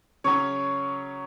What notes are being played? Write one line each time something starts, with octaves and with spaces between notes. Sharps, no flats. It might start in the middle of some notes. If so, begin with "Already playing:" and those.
C#3 F#3 C#4 C#5 C#6